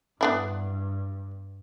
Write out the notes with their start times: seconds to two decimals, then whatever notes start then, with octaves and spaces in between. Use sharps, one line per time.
0.21 G2 B3 D4 E4